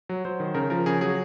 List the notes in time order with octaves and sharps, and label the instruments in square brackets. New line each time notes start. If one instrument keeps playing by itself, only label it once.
[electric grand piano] F#3
F#3 C5
D#3
C#3 A#4
F3 A#4
C#3 G#4
F#3 G#4